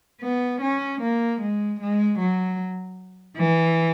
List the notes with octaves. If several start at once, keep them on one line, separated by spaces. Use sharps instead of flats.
B3
C#4
A#3
G#3
G#3
F#3
E3